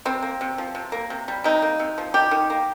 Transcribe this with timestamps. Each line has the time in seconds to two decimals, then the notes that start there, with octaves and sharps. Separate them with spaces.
0.05 C3 C4
0.22 A#3
0.41 C3
0.58 F3
0.75 C3
0.92 A#3
1.10 C3
1.28 G3
1.44 C3 D#4
1.62 A#3
1.79 C3
1.98 F3
2.14 D#3 G4
2.31 D#3
2.50 A#3